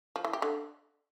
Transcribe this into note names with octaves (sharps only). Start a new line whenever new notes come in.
F3
E3
G4
D3